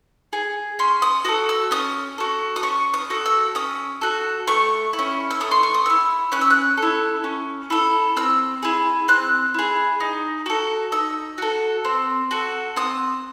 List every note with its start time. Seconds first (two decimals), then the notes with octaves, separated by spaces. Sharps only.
0.33 G#4
0.79 C#4 C6
1.02 D#6
1.24 F#4 A4 D#6
1.49 E6
1.71 C#4 D#6
2.18 F#4 A4
2.56 D#6
2.63 C#4 C#6
2.94 D#6
3.10 F#4 A4
3.26 E6
3.55 C#4 D#6
4.01 F#4 A4
4.47 A3 C#6
4.93 E4
4.99 C#4
5.30 E6
5.40 A3 D#6
5.51 C6
5.63 C#6
5.74 D#6
5.86 C#4 E6
5.90 E4
6.32 C#4 F#6
6.41 E6
6.50 F#6
6.77 A4
6.82 E4
7.24 C#4
7.70 E4 A4
8.16 C4 E6
8.63 E4 G#4
9.08 C4 F#6
9.54 E4 G#4
10.00 D#4
10.46 F#4 A4
10.92 D#4 E6
11.38 F#4 A4
11.85 C4
12.31 F#4 A4
12.76 C4 D#6